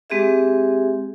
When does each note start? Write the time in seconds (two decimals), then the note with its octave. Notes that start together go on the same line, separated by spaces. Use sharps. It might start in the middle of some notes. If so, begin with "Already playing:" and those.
0.10 G#3 C4 G4 G#4 E5